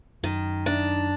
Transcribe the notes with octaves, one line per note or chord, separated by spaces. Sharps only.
F#2 D#3
D4